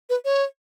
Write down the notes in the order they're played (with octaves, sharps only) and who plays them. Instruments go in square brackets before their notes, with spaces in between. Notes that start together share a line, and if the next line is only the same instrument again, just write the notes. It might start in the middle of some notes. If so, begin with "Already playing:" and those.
[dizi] B4
C#5